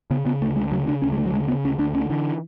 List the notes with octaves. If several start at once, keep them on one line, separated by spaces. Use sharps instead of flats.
C#3 B3
C#3 B3
D2 A3
D2 G#3
C#3 F#3
C#3 D4
D2 C#4
G#3
D2 A3
F#3
C#3 G#3
C#3 B3
D2 C#4
D2 D4
D3 C#4
D3 E3